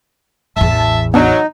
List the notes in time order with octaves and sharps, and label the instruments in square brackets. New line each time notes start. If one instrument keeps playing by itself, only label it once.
[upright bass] A1 E2 [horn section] E5 A5
[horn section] F#3 [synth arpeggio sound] B3 D4 D5 [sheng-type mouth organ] D#4